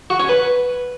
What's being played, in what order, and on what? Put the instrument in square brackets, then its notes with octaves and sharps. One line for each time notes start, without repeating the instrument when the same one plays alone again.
[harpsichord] F#4
C#4
B4